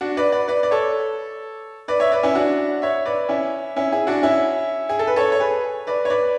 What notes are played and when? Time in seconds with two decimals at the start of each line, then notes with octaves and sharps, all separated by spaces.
0.01 D4 F#4
0.17 B4 D5
0.32 B4 D5
0.48 B4 D5
0.63 D5
0.71 A4 C#5
1.88 B4 D5
2.00 C#5 E5
2.12 B4 D5
2.23 C#4 E4
2.35 D4 F#4
2.82 C#5 E5
3.06 B4 D5
3.29 C#4 E4
3.76 C#4 E4
3.92 E4 G#4
4.07 D4 F#4
4.23 C#4 E4
4.89 G#4
4.99 A4
5.07 B4
5.16 A4 C#5
5.32 C#5
5.40 G#4 B4
5.87 B4 D5
6.05 C#5
6.10 B4 D5